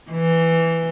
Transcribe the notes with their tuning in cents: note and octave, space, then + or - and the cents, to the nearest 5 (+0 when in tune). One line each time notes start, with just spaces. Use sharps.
E3 +5